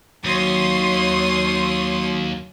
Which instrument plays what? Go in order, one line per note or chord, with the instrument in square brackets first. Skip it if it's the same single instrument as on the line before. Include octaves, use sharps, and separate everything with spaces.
[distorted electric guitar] D#2 [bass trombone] F#3 [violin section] C#5 C6 D#6